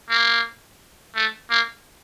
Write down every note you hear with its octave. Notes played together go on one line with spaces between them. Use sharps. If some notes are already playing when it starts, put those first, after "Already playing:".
A#3
A3
A#3